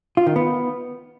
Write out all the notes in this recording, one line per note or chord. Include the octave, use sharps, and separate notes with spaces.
F4
D#3
B3